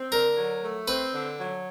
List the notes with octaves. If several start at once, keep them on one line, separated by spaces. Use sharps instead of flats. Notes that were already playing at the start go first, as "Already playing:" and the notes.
Already playing: C4
D3 A#4
F#3
A3
C4 B4
D3
F#3